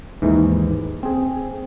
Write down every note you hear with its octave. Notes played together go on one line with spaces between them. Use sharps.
D#2 G#2 E3
C4 G#4